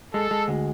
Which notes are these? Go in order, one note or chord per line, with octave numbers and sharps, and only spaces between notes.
G#3 A4
G#3
D2